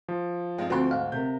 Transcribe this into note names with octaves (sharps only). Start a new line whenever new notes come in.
F3
G2 G#3 C4 F4
D2 C4 F#4 F#5 C6
G#2 F5 F#5
C3 A#4 G6